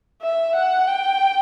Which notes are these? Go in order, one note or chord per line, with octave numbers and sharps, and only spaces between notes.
E5
F#5
G5